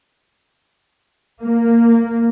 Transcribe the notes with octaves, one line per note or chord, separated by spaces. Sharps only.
A#3